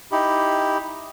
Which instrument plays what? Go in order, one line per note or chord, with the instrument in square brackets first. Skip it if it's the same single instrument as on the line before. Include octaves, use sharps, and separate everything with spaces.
[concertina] D#4 E4 G4